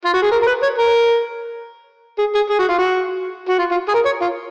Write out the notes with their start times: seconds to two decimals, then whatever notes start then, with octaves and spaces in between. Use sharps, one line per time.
0.05 F4
0.14 F#4
0.23 G#4
0.32 A#4
0.42 A#4
0.47 B4
0.62 C#5
0.78 A#4
2.19 G#4
2.34 G#4
2.50 G#4
2.59 F#4
2.69 F4
2.78 F#4
3.48 F#4
3.59 F4
3.71 F4
3.88 G#4
3.94 A#4
4.05 C#5
4.21 F4